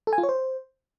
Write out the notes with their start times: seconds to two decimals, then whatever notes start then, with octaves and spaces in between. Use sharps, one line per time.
0.07 A4
0.13 G#5
0.18 F4
0.23 C#5
0.29 C5